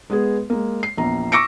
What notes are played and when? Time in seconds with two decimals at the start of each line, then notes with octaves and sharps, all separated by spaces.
0.10 G#3 B3 G#4
0.50 G#3 A#3
0.83 C7
0.97 A#1 E2 A#5
1.32 C#6 D6 E6 A#6 C#7 D7